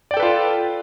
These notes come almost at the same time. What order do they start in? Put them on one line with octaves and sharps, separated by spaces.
D5 G5 A4 B4 F4